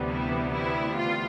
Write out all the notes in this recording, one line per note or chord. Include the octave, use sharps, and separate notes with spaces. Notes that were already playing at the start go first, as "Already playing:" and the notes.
Already playing: D2 C3 E3 G3 B3
E4
E4
F4